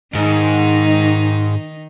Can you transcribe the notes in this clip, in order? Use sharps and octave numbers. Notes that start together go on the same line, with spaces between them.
G#2 D#3 D#4